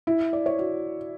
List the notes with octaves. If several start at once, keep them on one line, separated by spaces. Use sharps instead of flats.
E4
D5
C#5
F#4